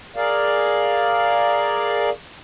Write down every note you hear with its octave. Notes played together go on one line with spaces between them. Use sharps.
G#4 A#4 D5 F5